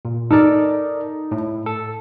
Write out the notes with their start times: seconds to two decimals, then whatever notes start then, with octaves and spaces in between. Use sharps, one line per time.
0.05 A#2
0.31 D#4 A4 A#4 D5
1.31 A2
1.66 A4